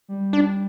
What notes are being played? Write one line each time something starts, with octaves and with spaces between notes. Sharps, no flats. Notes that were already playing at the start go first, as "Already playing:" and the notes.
G3
D4